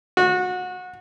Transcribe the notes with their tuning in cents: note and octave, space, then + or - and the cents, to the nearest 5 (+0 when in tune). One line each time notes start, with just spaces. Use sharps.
F#4 -25